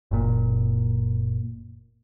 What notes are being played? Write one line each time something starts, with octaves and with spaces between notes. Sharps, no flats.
F#1 A#2